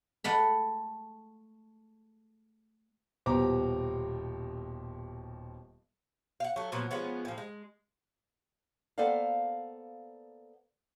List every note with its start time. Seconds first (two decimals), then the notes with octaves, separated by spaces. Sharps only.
0.24 A3 F#5 B5
3.26 D#1 B2 G4 C5 A#5 D6
6.40 F5 F#5
6.56 F#3 A3
6.72 A#2 F3 F#3 B3
6.91 F3 G#3 B3 C#4
7.25 A2 F3
7.38 G#3
8.98 A#3 B3 A4 C5 D5 F5